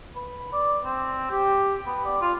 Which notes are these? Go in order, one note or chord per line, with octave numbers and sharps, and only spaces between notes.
B4
D5
C4
G4
B3
D5
F4